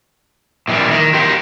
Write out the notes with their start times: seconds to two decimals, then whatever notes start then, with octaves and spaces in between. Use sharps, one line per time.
0.68 A#2 D#3 E3 F#3 G3
0.91 D#3 A#4
1.13 F4 G4 A#4